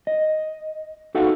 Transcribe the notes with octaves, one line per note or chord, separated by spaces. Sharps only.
D#5
D#4 F#4 A4 F5 F#5